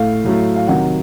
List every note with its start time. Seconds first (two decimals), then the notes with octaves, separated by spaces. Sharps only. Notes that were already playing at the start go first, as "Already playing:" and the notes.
Already playing: A2 A3 F5
0.25 A2 F#3 A3
0.56 F5
0.67 C3 D#3 F#3 F#5